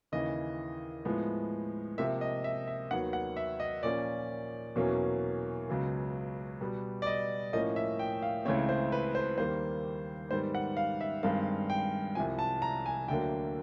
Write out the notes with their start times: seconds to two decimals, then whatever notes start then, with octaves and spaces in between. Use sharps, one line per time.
0.12 D#2 C#3 E3 D#5
1.05 A2 F3 G#3 B3
1.98 C3 F3 A#3 E5
2.21 D#5
2.44 E5
2.67 E5
2.91 D#2 D#3 F#3 B3 F#5
3.13 F#5
3.36 E5
3.60 D#5
3.83 A#2 F3 A#3 C#4 D5
4.76 E2 B2 F#3 A#3 C#4
5.68 C#2 C#3 F#3 B3
6.61 B2 G3 B3
7.02 D5
7.07 D#5
7.53 A2 F3 A#3 C#4 D#5
7.76 E5
7.99 G5
8.22 F5
8.45 C#2 C#3 E3 A3 C4 C#5
8.69 C5
8.92 B4
9.15 C5
9.38 D#2 D#3 G3 A#3 C5
10.31 G#2 D#3 G3 B3 C5
10.55 F#5
10.77 F5
11.01 E5
11.23 G2 D#3 G#3 C4 F5
11.70 G5
12.15 C2 C3 F3 G#5
12.39 A5
12.62 A#5
12.86 G#5
13.08 D2 D3 F#3 A#3 G5